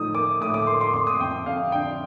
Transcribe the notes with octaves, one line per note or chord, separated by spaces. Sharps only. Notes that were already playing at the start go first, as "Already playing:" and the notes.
Already playing: A2 F3 D#4 D#6
A#3 D6
A2 D#6
D6
A#3 C6
C6
F2 C6
D#6
F2 G5
F2 F5
D4 G5